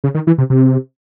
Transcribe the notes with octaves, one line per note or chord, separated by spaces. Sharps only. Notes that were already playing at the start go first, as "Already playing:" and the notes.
C#3
D#3
E3
C3
C3